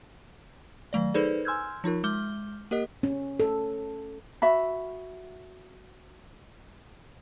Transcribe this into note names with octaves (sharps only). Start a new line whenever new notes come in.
D#3 F#3 A3 D5
D#4 G#4 A4 B4 C5 D5
G#5 C6 E6 F6 G6 G#6
F3 D#4 F4 A#4
G#3 D6 F6 G6 G7
A#3 G4 A#4 D#5
C#4
A4
F#4 E5 B5